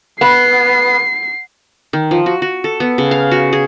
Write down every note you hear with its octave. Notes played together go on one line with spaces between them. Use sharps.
B3 C7
D#3
F3
F#4
F#4
A4
B3
C#3
F5
F#4
G#4